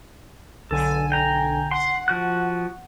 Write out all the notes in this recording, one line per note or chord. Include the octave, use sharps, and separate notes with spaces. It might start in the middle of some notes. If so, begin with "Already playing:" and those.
B1 D3 A4 G#5
G5 A#5
F#5 C6
F3 F#4 F#6